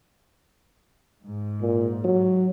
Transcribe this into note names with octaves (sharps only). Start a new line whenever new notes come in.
G#2
A#2
F#3